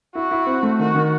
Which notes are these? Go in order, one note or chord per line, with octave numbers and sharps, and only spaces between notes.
E4 F#4
E4
C4
A3
D#3 F#4
D#3